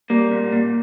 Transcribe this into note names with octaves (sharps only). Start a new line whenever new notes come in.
G3 A#3
A#2
A#2